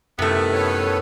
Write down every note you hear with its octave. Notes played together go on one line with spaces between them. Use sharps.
F#2 A2 C3 D#3 A3 B3
A4 B4 C#5